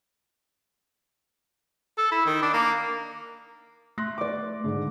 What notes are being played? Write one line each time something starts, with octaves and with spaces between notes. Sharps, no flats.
A4
E4
D#3
D4
A#3
A3 C6 F#6 A#6
D5 D6
G#2 D3